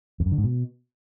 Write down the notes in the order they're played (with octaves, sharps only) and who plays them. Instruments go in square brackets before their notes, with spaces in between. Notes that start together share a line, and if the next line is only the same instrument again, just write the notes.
[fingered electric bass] F2
F#2
D3
G#2
B2